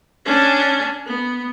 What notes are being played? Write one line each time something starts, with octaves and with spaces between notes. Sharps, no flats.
C#4 D4
B3